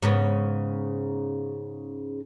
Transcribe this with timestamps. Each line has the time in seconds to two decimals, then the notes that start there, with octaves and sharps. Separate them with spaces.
0.03 G#2 C#3 B3